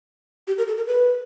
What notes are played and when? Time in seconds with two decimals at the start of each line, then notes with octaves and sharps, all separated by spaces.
0.47 G4
0.58 A#4
0.68 A4
0.77 A#4
0.87 B4